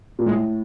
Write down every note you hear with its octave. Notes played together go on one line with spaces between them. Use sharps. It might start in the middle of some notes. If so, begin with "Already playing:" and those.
A#2
A2 G#3